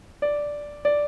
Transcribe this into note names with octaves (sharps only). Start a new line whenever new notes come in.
D5
D5